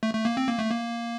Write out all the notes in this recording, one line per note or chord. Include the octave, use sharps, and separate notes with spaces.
A3
A3
A#3
C4
A#3
A3
A#3